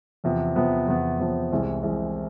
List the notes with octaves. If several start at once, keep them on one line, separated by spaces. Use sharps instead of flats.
E2 C3 F3 B3
E2 C3 F3 B3
E2 C3 F3 B3
E2 C3 F3 B3
C2 C3 E3 G#3
C2 C3 E3 G#3